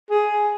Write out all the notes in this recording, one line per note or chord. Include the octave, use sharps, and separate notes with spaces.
G#4